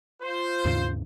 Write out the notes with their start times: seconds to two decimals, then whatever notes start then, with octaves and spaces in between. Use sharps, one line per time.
0.23 F4 C5
0.65 D#2 G#2 C#3